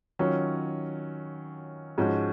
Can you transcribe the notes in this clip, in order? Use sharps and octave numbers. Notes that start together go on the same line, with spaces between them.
D#3 F#3 C#4 F4
G#2 F3 G#3 C#4 F#4